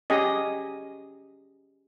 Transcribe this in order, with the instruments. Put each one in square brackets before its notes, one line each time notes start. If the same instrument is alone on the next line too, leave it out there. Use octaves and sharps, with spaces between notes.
[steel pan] C#4 G4 G#4 D#5